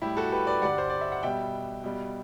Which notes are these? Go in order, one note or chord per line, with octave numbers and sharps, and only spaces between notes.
A2 G3 E4 G4
F#4 A4
G4 B4
B4 D5
G2 D3 G3 D5 F#5
C5
D5
E5
F#5
B2 G3 E5 G5
B2 G3